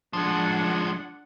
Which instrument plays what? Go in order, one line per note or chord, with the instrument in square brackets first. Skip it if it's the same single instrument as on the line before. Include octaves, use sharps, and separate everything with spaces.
[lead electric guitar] F3 G#3 [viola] D4 F#5